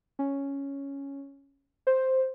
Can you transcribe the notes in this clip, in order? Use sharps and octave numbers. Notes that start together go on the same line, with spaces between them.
C#4
C5